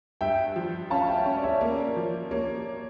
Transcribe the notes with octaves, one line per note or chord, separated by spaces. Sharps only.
G2 E5 G5
F3
C#4 F5 A5
E5 G5
C#4
D5
C#5 E5
A#3 A#4 D5
F3
A#3 C#5